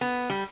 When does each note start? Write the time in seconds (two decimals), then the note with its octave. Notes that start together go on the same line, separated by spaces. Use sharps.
0.01 B3
0.30 G3